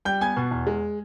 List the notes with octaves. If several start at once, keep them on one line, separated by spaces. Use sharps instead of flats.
G3 G5 G6
B3 G#5 G#6
B2
E2
G#3